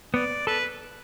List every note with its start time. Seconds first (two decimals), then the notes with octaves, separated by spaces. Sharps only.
0.14 B3 D5
0.47 A4 B4